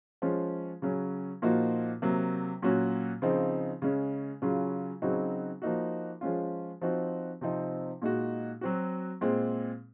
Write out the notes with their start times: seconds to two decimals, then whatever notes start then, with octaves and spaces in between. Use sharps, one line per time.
0.22 F3 G#3 C#4 F4
0.82 C#3 F#3 C#4
1.42 A#2 F3 A#3 D#4 F#4
2.02 C3 F#3 A#3
2.62 A#2 F#3 C#4 F#4
3.22 C#3 F3 C4 D#4
3.82 C#3 G#3 C#4
4.42 C#3 F#3 C#4 F4
5.02 C#3 F#3 C4 D#4 F#4
5.62 F3 A#3 D#4 F#4
6.21 F3 G#3 C#4 F4
6.81 F3 C4 D#4 F#4
7.41 C3 F3 C4 D#4
8.02 A#2 G#3 D#4 F#4
8.61 F#3 C4 F#4
9.21 A#2 G#3 C4